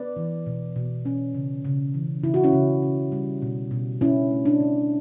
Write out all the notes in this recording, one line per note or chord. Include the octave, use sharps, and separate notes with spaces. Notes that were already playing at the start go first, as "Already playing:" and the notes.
Already playing: B3 B4 D5
E3
B2
B2
C#4
C#3
C#3
E3
C#3 E4
F#4
C#4 E4
C#3
C#3
G3
B2
B2
D3 C#4 E4
A3
D4
D3